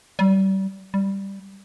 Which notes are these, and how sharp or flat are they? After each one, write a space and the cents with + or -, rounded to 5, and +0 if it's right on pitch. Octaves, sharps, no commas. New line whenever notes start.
G3 -30
G3 +0